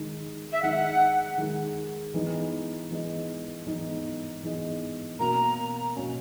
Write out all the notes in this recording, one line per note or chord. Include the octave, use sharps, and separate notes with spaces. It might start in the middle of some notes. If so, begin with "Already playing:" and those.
Already playing: D#3 G#3 D#4
E5
D#3 G#3 D#4 F#5
D#3 G#3 D#4
E3 B3 D#4 G#4 D#5
E3 B3 D#4 G#4 D#5
E3 B3 D#4 G#4 D#5
E3 B3 D#4 G#4 D#5
B2 A#3 C#4 F#4 A#5
B2 A#3 C#4 F#4